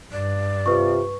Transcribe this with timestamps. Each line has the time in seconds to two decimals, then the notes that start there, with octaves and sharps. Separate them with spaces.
0.12 G2 D5
0.66 C3 F4 B4 C#6